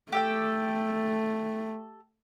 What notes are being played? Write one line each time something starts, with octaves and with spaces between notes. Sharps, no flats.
A3 G4 A4 G5